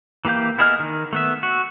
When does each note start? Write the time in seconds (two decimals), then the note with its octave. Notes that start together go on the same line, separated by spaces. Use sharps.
0.25 E3 A#3 G4 F5 G6
0.58 B3 E4 G#4 D#5 F6
0.80 D#3
1.13 A3 B3 E5
1.43 F#4